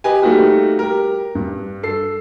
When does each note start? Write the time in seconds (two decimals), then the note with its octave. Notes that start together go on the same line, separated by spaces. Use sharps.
0.04 G4 B4 D#5 G#5
0.22 G3 A3 A#3 D#4 F#4 G4
0.79 G4 A#4
1.35 G2
1.83 A4 C7